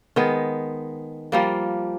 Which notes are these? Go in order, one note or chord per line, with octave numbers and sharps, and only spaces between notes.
D#3 G#3 B3
F3 G3 A#3